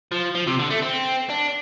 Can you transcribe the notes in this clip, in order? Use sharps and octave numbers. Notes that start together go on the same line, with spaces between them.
F3
F3
C3
D3
A3
C4
D4